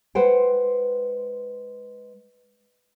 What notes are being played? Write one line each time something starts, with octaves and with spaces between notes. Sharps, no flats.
G#3 B4 C5 F#5 G5